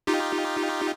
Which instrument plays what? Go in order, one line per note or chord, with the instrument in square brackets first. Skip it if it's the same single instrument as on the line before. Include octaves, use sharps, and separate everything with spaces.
[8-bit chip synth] D#4 F4 G4